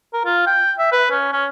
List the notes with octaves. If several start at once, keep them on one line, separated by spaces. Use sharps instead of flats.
A#4
F4
G5
E5
B4
C#4
C#4